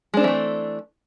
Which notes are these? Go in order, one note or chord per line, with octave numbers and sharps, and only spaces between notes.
E3 G#3 A3 C4 D4